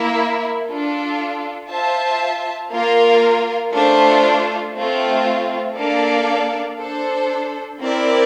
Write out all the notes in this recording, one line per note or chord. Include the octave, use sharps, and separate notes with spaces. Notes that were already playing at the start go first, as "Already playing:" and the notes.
Already playing: A#3 E4 A#4
D4 F4 A4
F4 C5 E5 A5
A#3 F4 A#4 F5
A3 D4 F4 A4 C5
A3 C4 F4
A#3 D4 A4 D5 F5
D4 A4 C5
C4 E4 A#4 D5